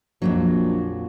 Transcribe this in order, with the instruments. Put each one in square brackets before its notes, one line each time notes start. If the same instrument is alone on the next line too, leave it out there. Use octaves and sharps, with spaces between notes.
[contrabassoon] A#1 [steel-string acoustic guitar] F2 A#2 F#3